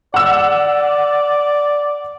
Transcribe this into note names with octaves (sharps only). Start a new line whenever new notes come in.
D5 F#5 E6